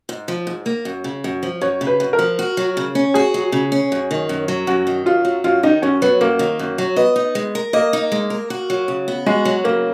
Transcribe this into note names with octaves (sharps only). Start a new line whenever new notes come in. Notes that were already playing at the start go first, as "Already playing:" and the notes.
G#2
F3
G#2
A#3
F#2
C#3
F#2
F3
F#2 C#5
C#3
B4
F#2
A#4
F3
F#4
F#3
C#3
C#4
F#4 G#4
F#3
C#3
C#4
F#2
D#3
F#2
F#3
F#2 F#4
D#3
F#2 F4
F#3
F#2 F4
D#3 D#4
F#2 C#4
F#3 B3
F#2 A#3
D#3
F#2
F#3
B3 D#5
D#4
G#3
A#4
A#3 D#5
D#4
G#3
A#4
F#4
F#3
C#3
B3
G#3 F#4
F#3
C#3 A#3